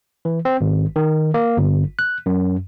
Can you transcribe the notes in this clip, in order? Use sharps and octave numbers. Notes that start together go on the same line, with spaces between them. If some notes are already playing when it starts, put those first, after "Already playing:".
E3
C4
G#1
D#3
A#3
G1
F#6
F#2